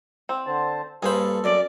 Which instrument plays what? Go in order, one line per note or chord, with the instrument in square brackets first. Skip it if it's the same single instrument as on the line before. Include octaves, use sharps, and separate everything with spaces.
[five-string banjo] C4
[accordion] D3 C5 A5
[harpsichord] G2 A#3 B5 [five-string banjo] G#4 C5 [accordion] A4
[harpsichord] F#2 [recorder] D5